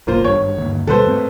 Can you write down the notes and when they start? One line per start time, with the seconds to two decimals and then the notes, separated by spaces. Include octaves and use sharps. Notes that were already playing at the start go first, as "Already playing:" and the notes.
0.07 F1 B1 A#3 F4 C5
0.24 G#1 G2 C#5
0.57 G1 D#2
0.87 D#2 B2 G3 A4 B4 C5
1.05 G#2 A3 C4